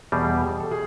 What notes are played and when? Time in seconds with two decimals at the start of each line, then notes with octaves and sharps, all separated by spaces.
0.12 E2 B2 G3 G#4
0.42 G4
0.60 A4
0.71 G#4